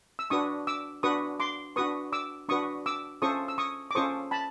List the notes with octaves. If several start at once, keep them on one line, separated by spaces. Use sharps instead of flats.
E6
D4 F#4 B4 C#6 D#6
D6 E6
D4 F#4 B4 C#6 D#6
C6 D6
D4 F#4 B4 C#6 D#6
D6 E6
D4 F#4 B4 C#6 D#6
D6 E6
C#4 F4 A4 C5 C#6 D#6
E6
C#6 D#6
D6
C#4 F4 A4 C5 C#6 D#6
A5 B5